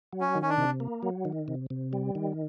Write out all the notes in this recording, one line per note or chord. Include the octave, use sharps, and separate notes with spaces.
F#3
C#4
D#3
C#4
D4
C3
A#3
F#3
D#3
C3
C3
G3
D#3